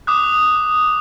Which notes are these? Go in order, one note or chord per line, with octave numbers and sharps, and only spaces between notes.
D6 D#6 F#6